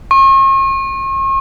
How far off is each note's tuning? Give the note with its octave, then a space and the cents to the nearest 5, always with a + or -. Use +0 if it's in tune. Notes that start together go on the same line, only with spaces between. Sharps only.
C#6 -45